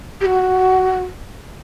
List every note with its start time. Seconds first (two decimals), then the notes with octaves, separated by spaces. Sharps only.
0.21 G4
0.25 F#4